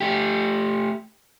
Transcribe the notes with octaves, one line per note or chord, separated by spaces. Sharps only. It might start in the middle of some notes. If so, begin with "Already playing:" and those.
A3 G4